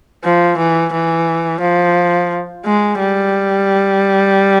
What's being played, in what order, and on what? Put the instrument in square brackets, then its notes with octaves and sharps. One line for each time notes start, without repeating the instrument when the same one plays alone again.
[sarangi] F3
E3
E3
F3
G#3
G3